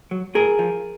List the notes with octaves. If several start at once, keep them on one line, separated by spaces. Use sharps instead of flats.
F#3
A2 G#4 A#4
F3